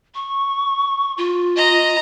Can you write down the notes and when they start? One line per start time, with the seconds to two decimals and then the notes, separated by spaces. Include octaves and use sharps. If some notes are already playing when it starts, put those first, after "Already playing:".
0.15 C#6
1.18 F4
1.56 D#5 A#5